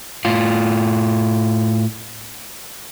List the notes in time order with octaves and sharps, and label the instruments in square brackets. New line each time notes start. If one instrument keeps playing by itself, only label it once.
[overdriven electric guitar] A2 F4